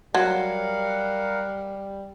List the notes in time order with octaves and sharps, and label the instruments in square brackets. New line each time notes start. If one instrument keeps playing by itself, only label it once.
[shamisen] F#3 [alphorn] G3 [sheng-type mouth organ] A#4 F5 F#5